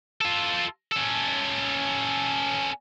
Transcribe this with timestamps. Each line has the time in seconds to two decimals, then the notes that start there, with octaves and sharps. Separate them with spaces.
0.21 F4 A4
0.92 C#4 A4